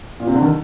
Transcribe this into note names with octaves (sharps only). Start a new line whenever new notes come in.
A#2
C3
D3
D#3